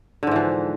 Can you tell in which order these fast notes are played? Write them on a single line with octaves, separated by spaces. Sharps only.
D3 G#2 E3 F3